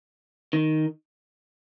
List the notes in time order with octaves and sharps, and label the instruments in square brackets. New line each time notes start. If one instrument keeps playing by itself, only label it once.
[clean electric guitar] D#3